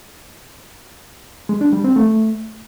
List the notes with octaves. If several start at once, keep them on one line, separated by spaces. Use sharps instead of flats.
G#3
D4
G3
C4
A3